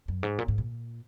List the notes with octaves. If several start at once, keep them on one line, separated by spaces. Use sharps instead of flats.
F#2
G#2
A#2
G#2
A#2